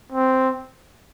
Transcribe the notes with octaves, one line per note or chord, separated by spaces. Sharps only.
C4